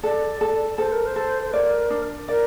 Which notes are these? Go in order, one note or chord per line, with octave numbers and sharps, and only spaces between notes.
A4 D5
A4
A4 C5
A#4
C5
A4
C5
A#4 D5
D4
A#4 D5